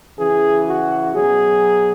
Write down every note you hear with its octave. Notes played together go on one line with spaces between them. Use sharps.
C#3 E3 G#4
F#4
B2 F#3 G#4